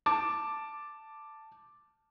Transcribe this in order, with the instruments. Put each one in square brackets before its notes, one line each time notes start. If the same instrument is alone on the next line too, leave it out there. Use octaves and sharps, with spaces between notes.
[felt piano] A5 D6